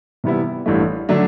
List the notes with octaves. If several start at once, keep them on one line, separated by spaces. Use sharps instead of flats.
C3 E3 G3 B3 E4
A1 G2 E3 A3
D3 F#3 A3 D4